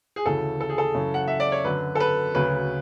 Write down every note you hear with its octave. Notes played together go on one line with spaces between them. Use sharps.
G#4
D2 C#3 E3 A4
A4
G#4
A4
F#2 C#3 E3
F#5
E5
D5
C#5
F#2 D3 F#3 B4
A4
B4
D2 C#3 F#3 B4